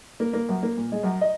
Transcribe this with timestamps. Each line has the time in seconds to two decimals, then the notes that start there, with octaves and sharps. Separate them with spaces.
0.20 A#3
0.33 A#3
0.49 F#2
0.63 A#3
0.77 A#2
0.92 G#3
1.03 F#2
1.21 D#5